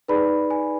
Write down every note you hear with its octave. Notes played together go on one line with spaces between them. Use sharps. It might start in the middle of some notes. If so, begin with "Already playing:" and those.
D#4 G#4 B4 D5 B5
G#5